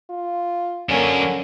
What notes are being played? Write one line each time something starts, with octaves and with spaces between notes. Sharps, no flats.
F4
F#2 D3 A#3 C#4